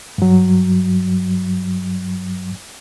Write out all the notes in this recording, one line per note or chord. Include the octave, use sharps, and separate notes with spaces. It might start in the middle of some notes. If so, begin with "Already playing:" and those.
G2 F#3